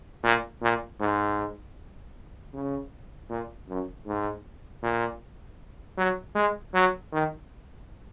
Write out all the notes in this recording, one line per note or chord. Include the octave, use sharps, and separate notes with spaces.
A#2
A#2
G#2
C#3
A#2
F#2
G#2
A#2
F#3
G#3
F#3
D#3